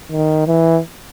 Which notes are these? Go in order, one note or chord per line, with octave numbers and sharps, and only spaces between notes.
D#3
E3